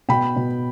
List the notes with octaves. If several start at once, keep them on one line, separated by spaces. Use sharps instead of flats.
B2 G5 B5
B2